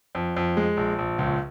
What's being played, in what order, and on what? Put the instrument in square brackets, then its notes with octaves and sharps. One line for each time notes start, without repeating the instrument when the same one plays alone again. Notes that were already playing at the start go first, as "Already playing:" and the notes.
[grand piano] F2
F2
G#3
A#1
A#1
C#2